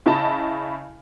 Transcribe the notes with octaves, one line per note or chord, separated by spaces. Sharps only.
C#3 E4 D#5 A5 B5